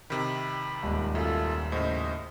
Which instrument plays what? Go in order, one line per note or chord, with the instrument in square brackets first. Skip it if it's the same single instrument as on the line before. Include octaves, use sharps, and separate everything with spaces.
[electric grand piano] C3 D#3 [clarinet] B5
[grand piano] D#1 G#2
[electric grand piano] F#2 [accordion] F4 A4 [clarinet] E5
[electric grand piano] A2 C#3 [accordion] C5 D#5